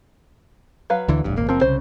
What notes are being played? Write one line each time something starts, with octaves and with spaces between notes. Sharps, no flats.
F#3 B4 F5
D2 D3 E3
D#1 A1 G2
D#1 G#1 A#3
F#1 F3 A#3 C4
C2 C#3 C5